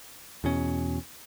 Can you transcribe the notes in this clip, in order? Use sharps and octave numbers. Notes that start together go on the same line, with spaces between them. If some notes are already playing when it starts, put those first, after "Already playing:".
E2 B2 C#4